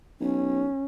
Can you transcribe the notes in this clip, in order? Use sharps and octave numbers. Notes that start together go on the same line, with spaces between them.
B1 C#4